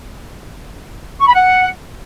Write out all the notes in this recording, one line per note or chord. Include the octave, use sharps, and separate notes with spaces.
C#6
B5
F#5